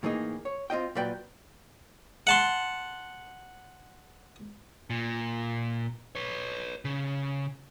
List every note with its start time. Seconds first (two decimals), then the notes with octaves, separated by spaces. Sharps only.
0.03 A2 E3 A#3 D#4 G#4
0.45 C#5
0.70 C4 F4 D#5 G5
0.95 A#2 F#3 B4 D5 G5
2.27 F#5 A5 C6
4.90 A#2
6.15 B4 C#5
6.85 C#3